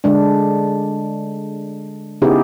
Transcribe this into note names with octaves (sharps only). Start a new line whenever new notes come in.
D3 G#3 D4
C#3 B3 D#4 E4 G4 G#4